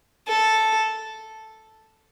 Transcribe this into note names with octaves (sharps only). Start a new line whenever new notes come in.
A4